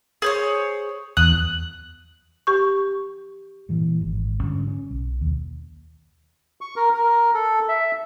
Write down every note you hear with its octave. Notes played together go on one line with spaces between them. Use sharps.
G#4 C5 C#5
E2 D#6 F#6
G4 C#6
A#2 E3 G3
G#1
G#2 D3 G3 C#4
C#4
B1
D#2
C#6
A#4
A#4
A4
E5